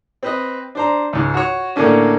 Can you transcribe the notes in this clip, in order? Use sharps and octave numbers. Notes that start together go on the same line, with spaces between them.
C4 B4 D#5
D4 C5 A#5
C#2 G#2
F#4 C#5
A2 D3 A#3 C#4 D4